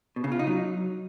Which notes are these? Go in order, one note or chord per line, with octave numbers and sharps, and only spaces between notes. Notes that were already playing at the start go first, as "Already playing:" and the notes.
B2
C#3
F4
D#4
F#3